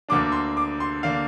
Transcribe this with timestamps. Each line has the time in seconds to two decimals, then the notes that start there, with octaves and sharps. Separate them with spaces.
0.09 D2 D3 A#3 D4 D6
0.32 C6
0.57 D6
0.80 C6
1.03 D3 A#3 D4 F5